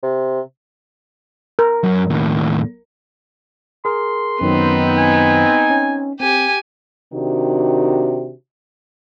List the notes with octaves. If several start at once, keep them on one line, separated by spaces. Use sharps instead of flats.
C3
A#4
F#2 F#3
D#2 A2
G#4 A#4 C6
F#2 D#3 F#3 B3 C4 D#4
G#5
C#4
C4 G4 G#5
C3 D#3 D4 F#4